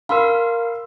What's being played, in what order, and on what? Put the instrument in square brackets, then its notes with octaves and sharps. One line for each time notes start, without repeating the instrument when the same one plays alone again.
[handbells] A#4 F5 [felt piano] B5 C6 E6